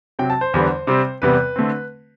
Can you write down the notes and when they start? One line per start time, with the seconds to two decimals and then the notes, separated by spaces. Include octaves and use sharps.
0.19 C3 F#3 C4 G5
0.30 A5
0.41 C5
0.54 E2 D3 G3 B3
0.87 C3 G3 C4
1.22 E2 C3 G3 B3 B4
1.56 D3 A3 C4